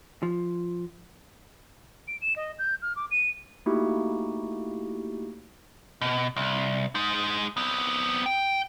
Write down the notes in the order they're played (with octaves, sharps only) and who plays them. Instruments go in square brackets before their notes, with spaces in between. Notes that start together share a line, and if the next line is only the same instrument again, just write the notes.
[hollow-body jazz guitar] F3
[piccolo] D7
E7
D#5
G6
F6
D6
D#7
[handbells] A3 A#3 D#4 E4 F#4 G4
[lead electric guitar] B2
C2
G#3 D#4
B3 C4
G5